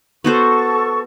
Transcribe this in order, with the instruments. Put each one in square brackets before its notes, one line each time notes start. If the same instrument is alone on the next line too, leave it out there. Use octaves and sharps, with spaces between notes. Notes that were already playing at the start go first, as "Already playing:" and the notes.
[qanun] B3 F#4 C5 [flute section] A4 C#6